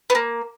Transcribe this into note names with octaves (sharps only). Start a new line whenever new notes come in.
B3
A#3